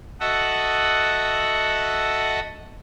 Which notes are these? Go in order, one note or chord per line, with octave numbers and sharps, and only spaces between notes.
F#4 A4 D#5 E5 F#5